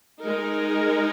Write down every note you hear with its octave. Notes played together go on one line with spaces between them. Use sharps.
G#3 D#4 A#4